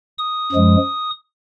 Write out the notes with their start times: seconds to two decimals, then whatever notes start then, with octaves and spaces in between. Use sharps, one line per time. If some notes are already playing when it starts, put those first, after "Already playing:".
0.18 D#6
0.52 F#2 F3 G#3